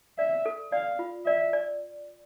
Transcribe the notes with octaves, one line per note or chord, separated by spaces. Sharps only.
D5 E5
A4
D5 F5
F4
D5 E5
D5